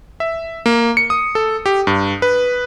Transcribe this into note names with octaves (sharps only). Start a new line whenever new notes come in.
E5
A#3
C#7
D#6
A4
G4
G2
B4